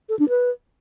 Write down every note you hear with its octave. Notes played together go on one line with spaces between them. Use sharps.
A4
D4
B4